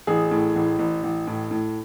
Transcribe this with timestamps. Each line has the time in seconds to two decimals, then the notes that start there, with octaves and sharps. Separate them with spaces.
0.07 A1 G#4
0.31 A2
0.56 A1
0.79 A1
1.03 A1
1.27 A2
1.51 A2